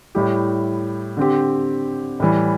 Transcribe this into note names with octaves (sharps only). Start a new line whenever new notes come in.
A2 G3 E4 G4
D3 C4 G4
A2 E3 G3